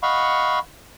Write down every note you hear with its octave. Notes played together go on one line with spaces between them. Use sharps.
D#5 F5 F#5 B5 C#6